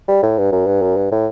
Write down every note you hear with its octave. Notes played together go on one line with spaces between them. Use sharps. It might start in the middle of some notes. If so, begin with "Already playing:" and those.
G3
A2
G2
F#2
G2
F#2
G2
A2